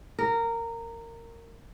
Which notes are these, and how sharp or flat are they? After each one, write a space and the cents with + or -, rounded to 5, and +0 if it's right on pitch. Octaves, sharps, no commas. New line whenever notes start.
A#4 -15